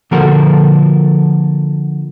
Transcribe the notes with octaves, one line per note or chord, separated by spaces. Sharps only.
D3 F3 A#3 F#4 A4 A#4